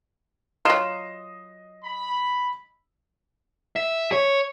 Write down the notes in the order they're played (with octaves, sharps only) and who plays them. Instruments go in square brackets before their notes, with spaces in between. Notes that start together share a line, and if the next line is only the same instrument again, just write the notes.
[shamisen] F#3 F4 [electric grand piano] D#5 C7 E7
[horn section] B5
[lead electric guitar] E5
C#5